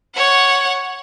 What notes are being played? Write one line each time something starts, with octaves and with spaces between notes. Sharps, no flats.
C#5 F#5